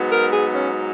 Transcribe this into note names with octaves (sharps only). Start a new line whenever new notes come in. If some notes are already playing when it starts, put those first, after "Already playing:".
Already playing: G#2 F#3 B3
A#4
G#4
C#4